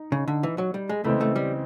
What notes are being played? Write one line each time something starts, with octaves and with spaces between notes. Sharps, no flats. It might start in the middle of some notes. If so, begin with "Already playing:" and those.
Already playing: D#4
C#3
D3
E3
F#3
G3
G#3
C#3 E3 G#3 A3 C4
A3
G3